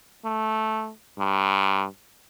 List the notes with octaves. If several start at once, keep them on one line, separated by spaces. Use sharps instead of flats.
A3
G2